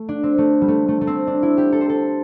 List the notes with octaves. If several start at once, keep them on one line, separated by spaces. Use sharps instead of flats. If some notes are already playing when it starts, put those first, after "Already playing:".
Already playing: A3
D4
C4
A3
G3
A3
A3
A3
C4
D4
E4
G4
A4
C5
A4